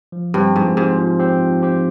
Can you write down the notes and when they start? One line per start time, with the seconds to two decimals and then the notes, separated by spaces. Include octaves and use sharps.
0.12 F3
0.34 G2 C4 G4 C5
0.55 G#2 F3
0.77 G#2 C4 G4 C5
0.98 F3
1.19 C4 G4 C5
1.41 F3
1.62 C4 G4 C5